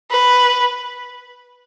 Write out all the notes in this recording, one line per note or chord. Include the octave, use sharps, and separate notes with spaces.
B4